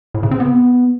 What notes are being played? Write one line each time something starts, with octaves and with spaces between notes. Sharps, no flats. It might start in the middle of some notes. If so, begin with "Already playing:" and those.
A2
C#3
C4
B3